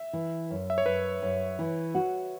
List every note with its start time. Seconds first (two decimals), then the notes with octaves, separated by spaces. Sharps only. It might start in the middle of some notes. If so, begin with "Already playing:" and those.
Already playing: E5
0.13 E3
0.50 F#2
0.70 E5
0.78 C#5
0.86 F#2 B4
1.23 F#2
1.59 E3
1.95 F#4